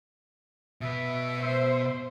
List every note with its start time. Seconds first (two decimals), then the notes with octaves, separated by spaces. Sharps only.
0.81 B2 B4 E5
1.40 C5